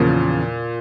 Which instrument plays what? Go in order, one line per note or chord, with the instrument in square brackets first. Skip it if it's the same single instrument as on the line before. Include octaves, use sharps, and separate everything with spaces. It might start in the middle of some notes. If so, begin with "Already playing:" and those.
Already playing: [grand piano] E2 C#3 F3 [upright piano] A#2